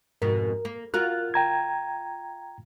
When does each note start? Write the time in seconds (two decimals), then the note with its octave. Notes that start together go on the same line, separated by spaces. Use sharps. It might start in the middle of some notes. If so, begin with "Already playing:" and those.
0.22 F2 G#2 B2 A#4
0.65 A#3
0.94 F4 F#4 A#4 F#6
1.34 G5 A#5 G#6